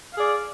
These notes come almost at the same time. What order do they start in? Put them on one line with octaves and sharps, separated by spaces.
F5 G#4 D5